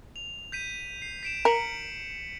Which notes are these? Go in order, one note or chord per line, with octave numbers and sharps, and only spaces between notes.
F7
G6 B6 D#7
C7
B6 D7 E7
A#4 B6 C#7 F#7